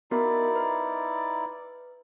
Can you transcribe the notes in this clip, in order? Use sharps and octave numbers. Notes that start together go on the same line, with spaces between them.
B3 D#4 E4 F#4 A#4 D5
B4